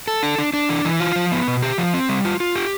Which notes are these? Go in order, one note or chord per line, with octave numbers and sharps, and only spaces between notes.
A4
D4
D4
D4
E3
E3
F4
F3
B3
B2
G4
F3
C4
G3
F4
F4
G4